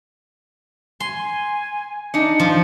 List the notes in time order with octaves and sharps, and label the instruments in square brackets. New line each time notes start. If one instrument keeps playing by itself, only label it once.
[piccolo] G#5 [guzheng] C6
[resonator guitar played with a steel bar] D4 D#4 [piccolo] C#7
[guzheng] F3 [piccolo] C6